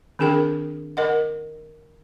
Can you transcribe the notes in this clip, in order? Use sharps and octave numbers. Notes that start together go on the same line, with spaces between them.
D#3 C4 D4 G#4 A#4 G5
A#4 D#5 F#5